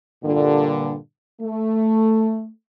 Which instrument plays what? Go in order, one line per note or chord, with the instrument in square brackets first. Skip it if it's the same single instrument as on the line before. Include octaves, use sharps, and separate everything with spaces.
[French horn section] G2 A#2 D3
A3